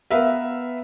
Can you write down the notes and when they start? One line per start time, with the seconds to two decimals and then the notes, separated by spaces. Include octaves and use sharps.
0.11 B3 A#4 B4 E5 F5